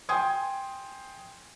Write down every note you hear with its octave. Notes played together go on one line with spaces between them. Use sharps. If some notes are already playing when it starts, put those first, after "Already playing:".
G5 G#5 C6 D#6 G#6